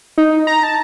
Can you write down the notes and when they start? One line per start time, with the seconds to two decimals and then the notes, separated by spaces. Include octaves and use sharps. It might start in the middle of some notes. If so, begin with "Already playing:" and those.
0.18 D#4
0.30 D#4
0.47 A#5
0.63 A5